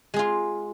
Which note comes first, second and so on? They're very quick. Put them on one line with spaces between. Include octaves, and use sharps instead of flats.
G#3 G#4 F4